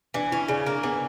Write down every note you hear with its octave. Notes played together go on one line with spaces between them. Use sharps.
E3 D4
C#4 E4
C#3 D4
A#3
E3 B3